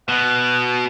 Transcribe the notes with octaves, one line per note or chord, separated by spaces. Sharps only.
B2 F#5